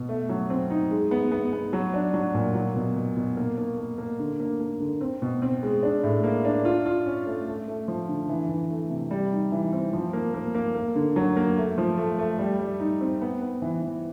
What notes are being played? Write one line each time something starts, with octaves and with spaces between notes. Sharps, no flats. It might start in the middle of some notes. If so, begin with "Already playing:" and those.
Already playing: B2
A3
F#3
C4
D#4
G#3
B3
B3
B3
F#3
D4
F#3
A#2
F#3
B2
B2
B2
A#3
A#3
A#3
A#3
D3
A#3
A#3
D3
C4
B2
C4
G#3
D4
A2
A#3
D4
F4
F4
C#4
A3
A3
A3
F3
D3
E3
E3
A3
C3
G3
D#4
E3
C4
F3
A#3
A#3
A#3
A#3
D3
F#3
A#3
A3
F3
A3
A3
G3
G3
D#4
C4
B3
B3
E3
E3